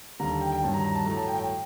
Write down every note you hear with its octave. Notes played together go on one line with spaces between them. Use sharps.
D#2 D3 G3 A#5
A5
G5
G5
G2 D#3 F#3 A5
A#5
A#5
A5
A2 F#3 A3 A#5
A5
G5
G5